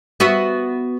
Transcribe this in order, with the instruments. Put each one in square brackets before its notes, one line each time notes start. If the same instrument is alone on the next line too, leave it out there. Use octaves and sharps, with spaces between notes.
[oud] B3 F#4 E5